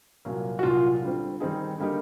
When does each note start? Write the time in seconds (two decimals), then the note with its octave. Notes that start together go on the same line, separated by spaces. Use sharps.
0.25 C2 A#2 F#3 A#3
0.59 F#4
0.63 C2 A#2 F#3 F4
1.02 D3 G3 C4
1.40 D#3 G3 C4 D#4 G#4
1.78 D3 G3 A#3 D#4 G4